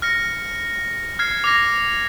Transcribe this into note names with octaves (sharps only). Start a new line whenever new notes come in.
F6 A#6 C#7
F6 G#6 C7
D6 F6 A#6